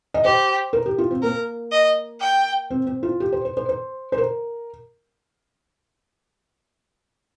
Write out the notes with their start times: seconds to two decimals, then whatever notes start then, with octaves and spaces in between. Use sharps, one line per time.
0.14 D#5
0.24 G4 C5
0.73 A#4
0.86 G4
0.98 F4
1.11 C4
1.22 A#3 A#4
1.72 D#5
2.21 G5
2.70 C4
2.87 C4
3.03 F4
3.20 G4
3.32 C5
3.45 C5
3.57 C5
3.69 C5
4.12 C5
4.18 A#4